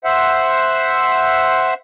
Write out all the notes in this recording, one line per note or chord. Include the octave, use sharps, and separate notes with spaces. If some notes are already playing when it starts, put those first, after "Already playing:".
C5 E5 F#5